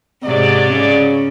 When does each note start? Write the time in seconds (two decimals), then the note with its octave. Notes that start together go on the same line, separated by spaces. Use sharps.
0.23 G#2 C3 F#3 D5
0.73 C#3